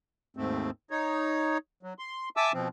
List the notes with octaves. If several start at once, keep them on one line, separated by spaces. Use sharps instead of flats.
D#2 G#2 A3 C4
D#4 C#5
F#3
C6
E5 G#5 A5 D6 E6
B2 F3 C4